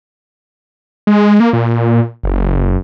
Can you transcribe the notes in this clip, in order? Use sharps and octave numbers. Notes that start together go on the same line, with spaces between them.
G#3
A#3
A#2
F#1